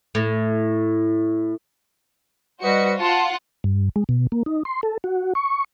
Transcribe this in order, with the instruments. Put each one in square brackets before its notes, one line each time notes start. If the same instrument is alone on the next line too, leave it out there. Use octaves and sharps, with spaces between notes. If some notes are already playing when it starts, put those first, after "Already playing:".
[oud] A2
[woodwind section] G3 B4 D#5 [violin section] F#4 C5 C#7
[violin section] F4 F#5 [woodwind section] A5 C6
[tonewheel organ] G2
G#3
B2
A#3
D#4
C6
A4
F#4
C#6